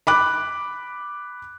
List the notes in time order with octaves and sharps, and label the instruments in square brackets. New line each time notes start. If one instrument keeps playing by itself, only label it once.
[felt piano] B5 D6 F#6